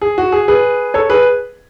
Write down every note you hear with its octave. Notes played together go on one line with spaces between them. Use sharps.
G#4
F#4
G#4
G#4 B4
A4 C#5
G#4 B4